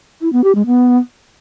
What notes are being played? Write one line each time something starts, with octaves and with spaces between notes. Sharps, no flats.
E4
B3
G4
G#3
B3